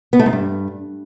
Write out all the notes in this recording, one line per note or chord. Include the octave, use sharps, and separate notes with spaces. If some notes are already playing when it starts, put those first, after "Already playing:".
B3
A3
G#2
G2